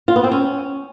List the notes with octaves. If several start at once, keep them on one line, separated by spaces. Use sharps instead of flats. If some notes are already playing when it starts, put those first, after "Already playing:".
F4
B3
C4
C#4